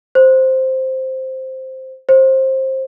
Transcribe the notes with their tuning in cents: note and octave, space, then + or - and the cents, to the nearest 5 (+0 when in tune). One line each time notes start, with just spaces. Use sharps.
C5 +0
C5 +20